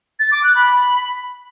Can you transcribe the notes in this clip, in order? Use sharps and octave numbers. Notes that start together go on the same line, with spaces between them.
A6
D6
F#6
B5